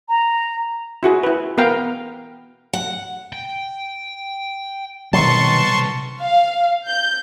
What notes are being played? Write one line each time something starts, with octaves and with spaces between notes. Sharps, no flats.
A#5
E4 F#4 G#4
E4 B4
B3 A#4 B4 F5 G5
F#5
G5
C2 B2 D#3 F#3 B4 A5 C6 C#6
F5
G6